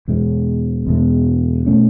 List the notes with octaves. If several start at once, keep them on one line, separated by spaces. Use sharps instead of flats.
E2 B2 G#3
E2 B2 G#3
B2 A3 C#4